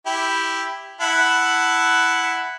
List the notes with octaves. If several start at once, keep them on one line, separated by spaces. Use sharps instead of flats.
E4 G4
E4 F#5 A5